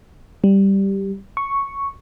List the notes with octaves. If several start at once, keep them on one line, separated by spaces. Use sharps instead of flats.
G3
C#6